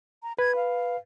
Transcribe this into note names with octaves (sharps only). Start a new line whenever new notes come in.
A#5
B4 G#6
F5